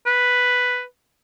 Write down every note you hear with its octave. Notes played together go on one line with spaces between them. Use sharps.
B4